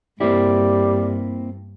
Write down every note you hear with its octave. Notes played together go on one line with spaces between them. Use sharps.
G2 G3 A#3 C4 E4